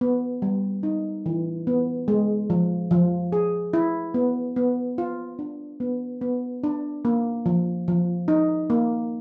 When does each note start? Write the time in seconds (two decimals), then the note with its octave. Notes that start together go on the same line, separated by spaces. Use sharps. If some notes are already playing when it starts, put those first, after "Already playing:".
0.01 B3
0.42 G3
0.83 D#4
1.26 E3
1.67 B3
2.08 G#3
2.50 F3
2.91 F3
3.32 G#4
3.73 E4
4.14 B3
4.56 B3
4.98 F4
5.39 D4
5.80 B3
6.21 B3
6.64 D4
7.05 A#3
7.46 F3
7.88 F3
8.28 D#4
8.70 A#3